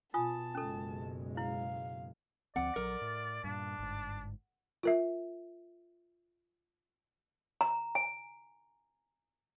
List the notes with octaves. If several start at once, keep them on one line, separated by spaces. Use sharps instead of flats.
B2 F4 G#5 A5 D#6
F#1 B2 G#3 C#4 A4
E4 F5
D2 F3 C4 D5 F#5
A#1 F#3 A#4
A2
G2 A#2 D4
G1 G#2
F4 A#4 E5
A#5
G#5